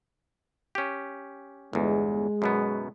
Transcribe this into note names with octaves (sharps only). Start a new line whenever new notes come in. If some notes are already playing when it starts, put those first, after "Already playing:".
C#4 G4
G1 E2 G#3
F#2 B2 B3